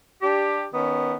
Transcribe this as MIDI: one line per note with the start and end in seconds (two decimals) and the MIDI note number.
0.22 0.65 62
0.22 0.65 67
0.74 1.16 51
0.74 1.16 59
0.74 1.16 61